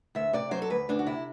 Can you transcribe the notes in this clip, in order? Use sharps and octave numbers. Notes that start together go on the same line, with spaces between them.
D2 E5
C3 D5
F#3 C5
A4
D2 B4
D2 D4
F#4
C3 E4